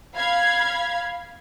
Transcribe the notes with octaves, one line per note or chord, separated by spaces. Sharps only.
F5 B5 G#6